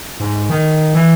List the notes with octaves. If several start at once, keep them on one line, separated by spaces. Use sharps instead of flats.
G#2
D#3
E3